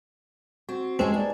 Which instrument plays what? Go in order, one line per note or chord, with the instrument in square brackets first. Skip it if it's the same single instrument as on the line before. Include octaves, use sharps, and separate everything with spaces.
[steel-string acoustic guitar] C4 [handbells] F#4
[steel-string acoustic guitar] G#3 C#4 G#4 [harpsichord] C4 [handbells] A5
[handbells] D#4 B4 D5 [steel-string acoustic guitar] G#4